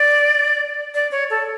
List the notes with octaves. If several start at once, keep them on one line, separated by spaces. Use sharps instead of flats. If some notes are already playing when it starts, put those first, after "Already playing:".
Already playing: D5
D5
C#5
A4